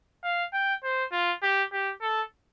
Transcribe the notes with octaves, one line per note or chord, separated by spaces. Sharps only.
F5
G5
C5
F4
G4
G4
A4